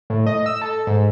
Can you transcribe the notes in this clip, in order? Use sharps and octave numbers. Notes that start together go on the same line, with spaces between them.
A2
D#5
E6
A4
G#2